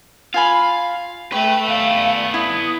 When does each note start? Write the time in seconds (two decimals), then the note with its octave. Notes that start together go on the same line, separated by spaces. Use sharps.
0.34 F4 F5 G#5 B5
1.32 A3 B4 G5 C#6
1.68 B3 D5 F5
2.34 E4 D#6